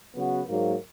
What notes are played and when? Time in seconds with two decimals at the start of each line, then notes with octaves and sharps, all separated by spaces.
0.15 C#3 F#3 B3 F#4
0.49 G#2 F#3 A#3